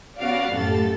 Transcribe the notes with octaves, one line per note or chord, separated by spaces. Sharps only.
B3 C#4 F#4 D5 F5 F#5
F#2 A2 G4 A4 A6